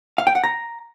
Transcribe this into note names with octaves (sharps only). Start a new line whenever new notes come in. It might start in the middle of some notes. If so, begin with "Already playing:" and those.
F5
G5
F#5
A#5